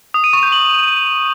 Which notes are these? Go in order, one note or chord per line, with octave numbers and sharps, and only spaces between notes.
D#6
D#7
C#6
G6
F#7